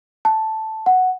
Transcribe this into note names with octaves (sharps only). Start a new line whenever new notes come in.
A5
F#5